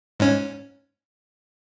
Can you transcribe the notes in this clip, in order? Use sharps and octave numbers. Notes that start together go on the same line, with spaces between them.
G#2 C#4